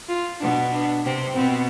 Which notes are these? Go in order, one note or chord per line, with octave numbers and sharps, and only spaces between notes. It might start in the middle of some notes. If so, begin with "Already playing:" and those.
F4
B2 B3 D4
D4
C3 C4
B2 B3 C4